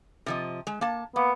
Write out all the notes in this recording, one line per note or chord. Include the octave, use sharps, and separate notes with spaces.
C3 F3 D#5
G#3
A#3 A5
A#3 B3